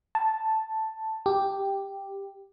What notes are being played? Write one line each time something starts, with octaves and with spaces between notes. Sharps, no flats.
A5
G4